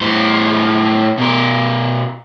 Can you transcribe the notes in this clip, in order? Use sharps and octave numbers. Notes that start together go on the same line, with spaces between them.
A2 C5
B2 A#4